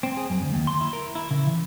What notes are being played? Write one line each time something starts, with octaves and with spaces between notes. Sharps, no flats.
C4
G#4
F#2
D2
D#2
C6
E4
A#4
E4
C#3
E3